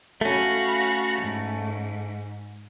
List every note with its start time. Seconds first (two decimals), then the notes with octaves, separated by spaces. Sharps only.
0.21 A3 C#4 F#4 F5 B5
1.21 G#2